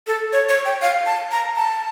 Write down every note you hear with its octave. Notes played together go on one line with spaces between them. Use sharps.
A4
C#5
C#5
G5
F5
A5
A#5
A5